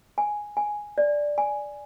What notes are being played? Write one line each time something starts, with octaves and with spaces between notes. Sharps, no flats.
G#5
G#5
D5
G#5